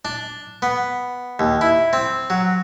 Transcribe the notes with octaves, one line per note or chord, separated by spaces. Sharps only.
D4
B3
D#2
E4
C4
F#3